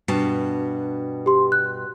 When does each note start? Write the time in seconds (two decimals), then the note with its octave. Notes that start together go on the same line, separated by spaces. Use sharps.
0.08 G2 B2 A5
1.26 G4 C6
1.52 F#6